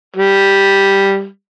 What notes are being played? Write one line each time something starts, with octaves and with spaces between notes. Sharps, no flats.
G3